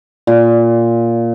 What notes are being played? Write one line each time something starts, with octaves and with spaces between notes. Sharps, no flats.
A#2